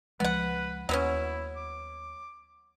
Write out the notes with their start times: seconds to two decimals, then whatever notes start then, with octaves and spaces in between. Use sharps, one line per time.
0.20 C#2 F3 G#3 B3 B4 F#5
0.89 D#2 F#3 B3 C#4 E4
1.56 D6